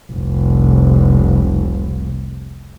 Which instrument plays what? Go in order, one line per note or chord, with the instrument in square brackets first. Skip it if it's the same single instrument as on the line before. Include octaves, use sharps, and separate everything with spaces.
[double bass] F1 C2